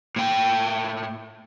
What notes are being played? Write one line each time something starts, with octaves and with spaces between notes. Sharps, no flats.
A2 G5